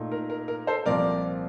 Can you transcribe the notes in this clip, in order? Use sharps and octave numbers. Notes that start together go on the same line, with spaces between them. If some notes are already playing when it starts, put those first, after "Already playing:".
Already playing: A#2 A3 D#4
A#4
A#4
A#4
A4 C5
C2 A#2 F3 C4 A#4 D5